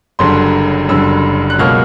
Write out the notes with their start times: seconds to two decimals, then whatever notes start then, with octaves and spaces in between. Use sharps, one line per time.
0.19 F#1 F#2 D3 G3 C6
0.89 F#1 F#2 D3 G3 E6
1.50 F#6
1.59 C#2 B2 F#3 A#3 F6